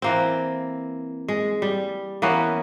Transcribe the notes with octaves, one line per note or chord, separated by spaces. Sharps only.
E3 A#3 C4
G#3
G3
E3 A#3 B3 C#4